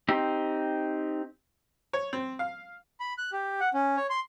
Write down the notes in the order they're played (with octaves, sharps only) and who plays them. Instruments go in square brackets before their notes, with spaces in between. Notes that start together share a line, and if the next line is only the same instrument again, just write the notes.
[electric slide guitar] C4 D#4 G4
[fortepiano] C#5
C4
F5
[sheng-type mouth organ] B5
F#6
G4
F#5
C#4
C#5
C6